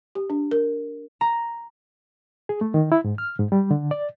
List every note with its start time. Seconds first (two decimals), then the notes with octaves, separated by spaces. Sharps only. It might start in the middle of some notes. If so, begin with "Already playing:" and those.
0.15 G4
0.30 D4
0.51 A#4
1.21 A#5
2.49 G#4
2.61 A3
2.74 D#3
2.92 E4
3.04 G#2
3.18 F6
3.39 G#2
3.52 G3
3.71 D3
3.91 D5